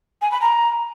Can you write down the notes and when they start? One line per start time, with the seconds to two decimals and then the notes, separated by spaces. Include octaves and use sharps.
0.22 G#5
0.32 B5
0.41 A#5